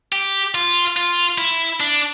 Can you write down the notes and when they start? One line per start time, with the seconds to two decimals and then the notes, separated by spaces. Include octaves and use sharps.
0.12 G4
0.55 F4
0.97 F4
1.38 E4
1.80 D4